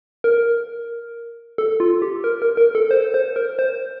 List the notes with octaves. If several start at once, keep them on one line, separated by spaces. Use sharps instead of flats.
A#4
A4
F4
G4
A#4
A#4
A#4
A4
C5
C5
A#4
C5